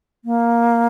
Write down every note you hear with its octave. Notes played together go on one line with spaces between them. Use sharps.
A#3